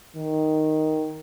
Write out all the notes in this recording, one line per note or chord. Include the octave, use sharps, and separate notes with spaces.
D#3